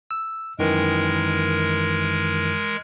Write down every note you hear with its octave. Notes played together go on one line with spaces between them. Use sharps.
E6
F#2 D#3 E3 G#3 A#4